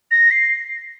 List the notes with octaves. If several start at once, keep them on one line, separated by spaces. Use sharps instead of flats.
A#6
C7